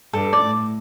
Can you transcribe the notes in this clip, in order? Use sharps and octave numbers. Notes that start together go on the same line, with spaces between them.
G2 A4
D5
A2